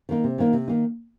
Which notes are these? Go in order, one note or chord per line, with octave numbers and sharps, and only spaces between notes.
D#3 A#3 D#4
C3
D#3 A#3 D#4
C3
D#3 A#3 D#4